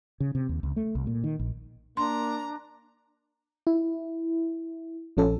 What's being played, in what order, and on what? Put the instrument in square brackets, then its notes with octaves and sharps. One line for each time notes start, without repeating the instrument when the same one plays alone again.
[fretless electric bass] C#3
C3
D#2
C#2
A3
C2
A#2
D#3
A#1
[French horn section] A#3 [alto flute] D4 [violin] A#5 [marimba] C6
[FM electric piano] E4
A#1 F3 C#4 A4